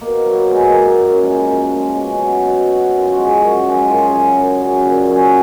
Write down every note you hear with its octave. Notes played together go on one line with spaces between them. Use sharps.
B2 A#3
F#3
B3
B2 G#3
A#3
F#3
A#3
F#2
F3 G#3
F#2
F3 G#3
B2 C#4
F#3
B2
F#3
F#2
F4
F#4
F3 G#3
G#4
F#2 F#4
F3 G#3
F#2 F4
G#4
C#3 F#3
F#2
C#3 F#3
A#2
F#3 C#4